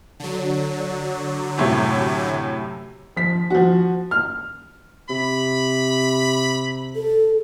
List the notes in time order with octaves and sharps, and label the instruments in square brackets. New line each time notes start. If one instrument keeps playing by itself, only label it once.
[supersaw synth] D3 F#3
[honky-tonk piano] F#2 A2 C3
[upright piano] F3 B6
F3 F#4
F6
[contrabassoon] C3 [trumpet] B5
[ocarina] A4